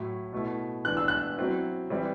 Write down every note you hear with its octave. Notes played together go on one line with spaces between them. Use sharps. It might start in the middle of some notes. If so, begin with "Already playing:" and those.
Already playing: A2 F#3 A3 E4
B2 A3 E4
E3 B3 D4 F#6
E6
F#6
F#3 C4 E4
E3 G3 C4 E4